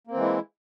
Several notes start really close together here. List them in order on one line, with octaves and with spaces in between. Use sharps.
A#3 C4 E3 G#3 E4